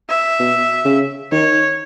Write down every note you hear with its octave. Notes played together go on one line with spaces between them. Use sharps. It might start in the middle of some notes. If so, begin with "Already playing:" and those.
E5
B2
C#3
D#3 C#5